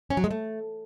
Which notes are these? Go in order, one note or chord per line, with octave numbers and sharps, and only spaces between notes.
C#4
F#3
G#3
A3